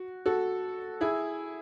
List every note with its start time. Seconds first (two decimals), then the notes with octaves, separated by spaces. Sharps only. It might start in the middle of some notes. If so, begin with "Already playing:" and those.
Already playing: F#4
0.26 F#4 A4
1.01 E4 G#4